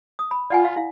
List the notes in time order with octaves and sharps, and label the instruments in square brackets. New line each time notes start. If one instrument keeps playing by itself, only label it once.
[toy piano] D#6
B5
[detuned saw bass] F4 [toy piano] D5 F#5 G#5
[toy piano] F5
E4 F5